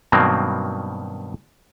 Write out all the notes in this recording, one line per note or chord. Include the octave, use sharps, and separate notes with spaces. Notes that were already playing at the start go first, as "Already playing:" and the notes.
G2 B2 D#3 F#3 A#3 C4